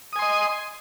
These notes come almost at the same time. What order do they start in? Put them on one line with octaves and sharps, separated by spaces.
D#6 G#5 C6 D#5